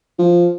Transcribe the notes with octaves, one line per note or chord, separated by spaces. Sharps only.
F3